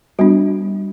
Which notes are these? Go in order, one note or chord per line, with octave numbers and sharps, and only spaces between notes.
G3 B3 D4 F#4